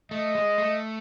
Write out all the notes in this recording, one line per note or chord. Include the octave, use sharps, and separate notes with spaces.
A3 D#5
G#3
A3